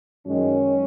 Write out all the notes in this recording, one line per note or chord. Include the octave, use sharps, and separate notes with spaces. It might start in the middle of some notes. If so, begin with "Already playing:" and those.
F#2 D#3 G#3 C#4